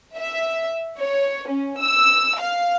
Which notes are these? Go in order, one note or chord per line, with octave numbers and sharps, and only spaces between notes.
E5
C#5
C#4
E6
F5